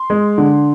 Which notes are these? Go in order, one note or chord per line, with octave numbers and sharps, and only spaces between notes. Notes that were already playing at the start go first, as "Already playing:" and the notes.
Already playing: C6
G#3
D3